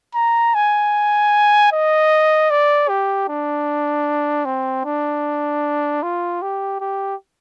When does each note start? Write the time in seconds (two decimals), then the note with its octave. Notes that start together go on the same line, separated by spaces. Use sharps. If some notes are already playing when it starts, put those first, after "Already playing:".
0.15 A#5
0.55 G#5
1.72 D#5
2.51 D5
2.89 G4
3.29 D4
4.45 C4
4.85 D4
6.03 F4
6.42 G4
6.81 G4